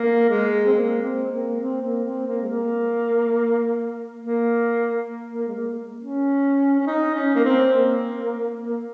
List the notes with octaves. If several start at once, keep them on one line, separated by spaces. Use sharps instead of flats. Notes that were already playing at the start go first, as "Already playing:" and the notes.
Already playing: A#3
G#3
C4
A#3
C4
A#3
C4
A#3
C4
A#3
G#3
A#3
A#3
A#3
G#3
A#3
C#4
C#4
D#4
C#4
A#3
C4
A#3
A#3